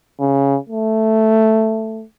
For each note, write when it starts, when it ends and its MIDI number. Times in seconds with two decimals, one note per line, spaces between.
0.20 0.58 49
0.69 2.03 57